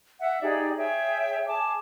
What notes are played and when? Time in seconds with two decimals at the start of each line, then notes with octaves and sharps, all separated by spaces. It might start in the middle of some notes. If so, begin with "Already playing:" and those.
0.20 E5 F#5
0.41 D#4 G4 G#4 D5
0.77 G#4 C#5 E5 G5
1.47 G#4 G#5 A5 D6